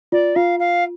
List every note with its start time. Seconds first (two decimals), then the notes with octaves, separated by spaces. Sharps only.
0.12 F4 D5
0.35 F4 F5
0.59 F5